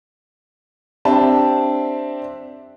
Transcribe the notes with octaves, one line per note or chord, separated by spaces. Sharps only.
C4 D4 G4 E5 A5